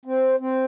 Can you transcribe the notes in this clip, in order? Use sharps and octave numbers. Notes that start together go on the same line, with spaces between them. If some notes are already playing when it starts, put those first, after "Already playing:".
C4
C4